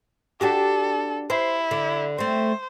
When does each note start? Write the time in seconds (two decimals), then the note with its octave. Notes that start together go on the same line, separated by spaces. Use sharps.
0.41 D4 F#4 G4 A4
1.30 E4 C5
1.71 D3
2.18 A3 C4 C5